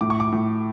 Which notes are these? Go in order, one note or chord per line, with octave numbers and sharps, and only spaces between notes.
A2 D6
C#6
D6
A2